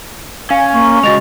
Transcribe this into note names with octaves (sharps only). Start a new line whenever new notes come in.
C#4 F5 G#5
A#3 C#6
C#3 G#3 F#4 D#5 A6 F7